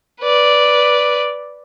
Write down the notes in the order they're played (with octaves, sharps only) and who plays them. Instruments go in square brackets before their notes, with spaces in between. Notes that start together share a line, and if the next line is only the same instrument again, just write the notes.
[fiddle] B4 D5